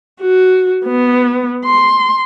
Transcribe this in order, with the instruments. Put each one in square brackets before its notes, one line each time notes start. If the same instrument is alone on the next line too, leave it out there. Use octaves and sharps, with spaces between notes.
[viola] F#4
B3
C6